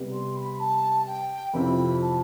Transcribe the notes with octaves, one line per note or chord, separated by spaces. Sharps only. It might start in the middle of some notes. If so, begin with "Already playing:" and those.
Already playing: C3 G3 B3
C6
B5
A5
G5
F2 C3 F3 C4 E4 B5
A5